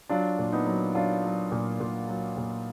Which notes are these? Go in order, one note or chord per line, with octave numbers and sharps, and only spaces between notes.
F#3 D4 F4
A#2
B3 D#4
F#3
F#3 D4 F4
F#3
A#2
A#2
F#3
A#2